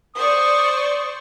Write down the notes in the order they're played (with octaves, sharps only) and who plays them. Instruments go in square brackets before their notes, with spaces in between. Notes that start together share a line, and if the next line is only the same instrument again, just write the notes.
[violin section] C5 D5 C#6 [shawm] D#6